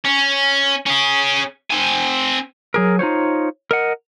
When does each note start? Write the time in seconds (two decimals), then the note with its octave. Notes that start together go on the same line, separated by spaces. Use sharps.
0.05 C#4
0.87 C#4 G#4
1.70 C4 G#5
2.74 F#3 G#4 A#4
2.99 D#4 F4 C5 C#5
3.71 A#4 D#5 F#5